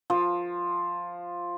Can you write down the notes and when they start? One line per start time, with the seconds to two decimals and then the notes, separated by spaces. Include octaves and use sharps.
0.10 F3